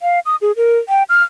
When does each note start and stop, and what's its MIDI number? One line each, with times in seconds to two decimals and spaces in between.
0.02 0.20 77
0.26 0.36 87
0.42 0.52 68
0.57 0.78 70
0.89 1.03 79
1.09 1.23 89